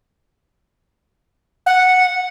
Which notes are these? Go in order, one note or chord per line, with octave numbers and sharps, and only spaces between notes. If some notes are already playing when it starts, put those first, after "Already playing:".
F#5